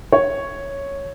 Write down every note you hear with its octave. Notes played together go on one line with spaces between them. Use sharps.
C#5